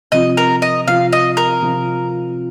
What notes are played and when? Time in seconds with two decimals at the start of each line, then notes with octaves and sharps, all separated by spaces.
0.12 C3 F3 C4 F4 D#5
0.37 A#4
0.62 D#5
0.87 C3 F3 C4 F4 F5
1.13 D#5
1.37 A#4
1.62 C3 F3 C4 F4